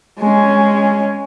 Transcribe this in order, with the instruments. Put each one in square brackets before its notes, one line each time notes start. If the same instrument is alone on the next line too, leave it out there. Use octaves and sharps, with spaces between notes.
[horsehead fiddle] G#3 C#4